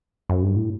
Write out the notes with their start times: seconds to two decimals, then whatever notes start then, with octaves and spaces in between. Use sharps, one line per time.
0.29 F#2
0.43 G2
0.56 A2